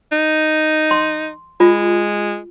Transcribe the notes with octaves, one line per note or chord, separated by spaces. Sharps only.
D#4
C6
G#3 F4